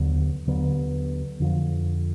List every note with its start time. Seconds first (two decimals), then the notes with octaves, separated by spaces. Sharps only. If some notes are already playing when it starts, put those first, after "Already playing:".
Already playing: D#2 D3 F#3 B3
0.47 D#2 D3 F#3 B3
1.40 F2 D3 F3